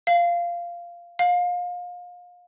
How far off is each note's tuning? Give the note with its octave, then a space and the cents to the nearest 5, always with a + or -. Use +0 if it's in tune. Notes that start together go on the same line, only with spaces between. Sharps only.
F5 -10
F5 +30